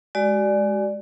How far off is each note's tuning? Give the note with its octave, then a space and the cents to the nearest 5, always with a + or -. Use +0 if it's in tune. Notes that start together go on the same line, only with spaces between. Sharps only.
G#3 +5 F#4 +40 D5 +5